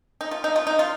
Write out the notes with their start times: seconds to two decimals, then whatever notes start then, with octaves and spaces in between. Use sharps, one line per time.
0.21 D#4
0.31 F4
0.44 D#4
0.56 F4
0.67 D#4
0.79 F4